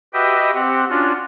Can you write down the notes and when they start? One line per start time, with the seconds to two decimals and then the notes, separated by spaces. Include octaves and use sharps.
0.14 F#4 G4 B4 D#5 E5 G5
0.55 C4 G4 F#5
0.89 C#4 D4 F4 F#4